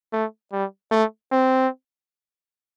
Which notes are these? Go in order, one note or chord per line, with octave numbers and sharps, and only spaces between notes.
A3
G3
A3
C4